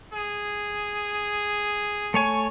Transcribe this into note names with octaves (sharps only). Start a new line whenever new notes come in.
G#4
A3 C#5 G#5